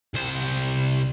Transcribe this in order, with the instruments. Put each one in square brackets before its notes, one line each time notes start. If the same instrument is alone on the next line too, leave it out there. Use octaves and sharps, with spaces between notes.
[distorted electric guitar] C2 C5